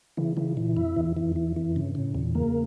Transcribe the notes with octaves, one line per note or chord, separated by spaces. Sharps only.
C#3 E3
C#3 E3
A#2 E3
F2 E4
E2 E3
F2 E3
E2 E3
F2 E3
G2 C#3
A2 C#3
E2 A#2
C#3 A#3